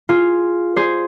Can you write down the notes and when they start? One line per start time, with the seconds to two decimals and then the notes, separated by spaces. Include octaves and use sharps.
0.09 F4 G#4
0.76 G#4 C5